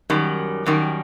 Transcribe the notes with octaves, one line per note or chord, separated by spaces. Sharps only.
F#2 D#3 G3
F#2 D#3 G3